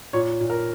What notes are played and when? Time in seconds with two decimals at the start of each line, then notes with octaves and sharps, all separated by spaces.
0.13 A#2 C#5
0.40 A#2
0.50 A#4